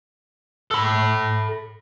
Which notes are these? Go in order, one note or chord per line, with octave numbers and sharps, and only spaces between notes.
A4 B5